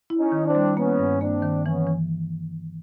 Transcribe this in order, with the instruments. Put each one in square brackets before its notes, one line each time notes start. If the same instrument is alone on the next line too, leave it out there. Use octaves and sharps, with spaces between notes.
[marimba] E4
[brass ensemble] C#4 D#4
[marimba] D#3
[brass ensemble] C4 D4
[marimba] G3
[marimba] A#3 [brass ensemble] B3 C#4
[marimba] G2
[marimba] A#3 [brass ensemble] C4 D4
[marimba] D#3
[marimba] E3 [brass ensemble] B3 C#4
[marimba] E3